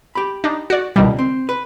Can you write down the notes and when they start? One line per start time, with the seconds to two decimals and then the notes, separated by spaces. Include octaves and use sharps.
0.15 G4 B5
0.44 D4 D#4
0.70 F#4 D5
0.96 C#2 B2 D#3 G3
1.19 C4
1.49 B4